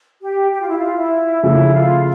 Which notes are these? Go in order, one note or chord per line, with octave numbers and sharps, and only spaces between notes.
G4
G4
F4
E4
F4
E4
C#3 F3 A3 E4
F4